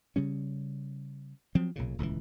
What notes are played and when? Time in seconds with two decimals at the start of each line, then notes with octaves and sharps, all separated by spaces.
0.16 C#3 G3 C#4
1.55 F3 F#3 C4
1.76 B1 A#2 C#3
1.98 D#1 C#2 C#3 E3